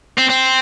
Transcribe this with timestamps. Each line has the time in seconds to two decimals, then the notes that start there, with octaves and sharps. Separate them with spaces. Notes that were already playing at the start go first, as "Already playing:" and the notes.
0.18 C4
0.30 C4